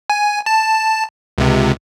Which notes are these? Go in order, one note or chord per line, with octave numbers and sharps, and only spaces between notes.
G#5
A5
C#2 C3